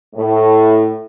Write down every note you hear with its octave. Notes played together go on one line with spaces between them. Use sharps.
A2